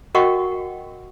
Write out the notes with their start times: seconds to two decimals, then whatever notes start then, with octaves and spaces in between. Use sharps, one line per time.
0.15 F#4 A#4 D#5 F#5 G5 C#6